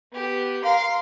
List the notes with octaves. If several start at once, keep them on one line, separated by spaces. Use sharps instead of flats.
B3 G4
A#4 F5 C6